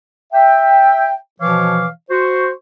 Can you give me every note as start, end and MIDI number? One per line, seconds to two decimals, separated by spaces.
0.33 1.14 76
0.33 1.14 79
1.41 1.87 47
1.41 1.87 52
1.41 1.87 53
1.41 1.87 73
1.41 1.87 77
1.41 1.87 86
2.10 2.50 66
2.10 2.50 72
2.10 2.50 85